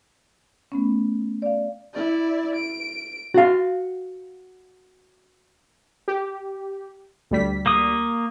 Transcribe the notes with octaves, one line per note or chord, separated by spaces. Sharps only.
A3 B3 C#4
D5 F5
E4 D5
D7
F#4 F5
G4
D2 G3 B6
A#3 D#6